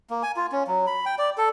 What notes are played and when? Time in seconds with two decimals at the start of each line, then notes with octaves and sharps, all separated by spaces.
0.10 A#3
0.23 G#5
0.36 F4
0.52 C#4
0.67 F#3
0.87 B5
1.06 G5
1.18 D5
1.38 A4